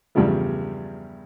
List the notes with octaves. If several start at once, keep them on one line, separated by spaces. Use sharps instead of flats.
E2 G2 C#3 F3 G3 A3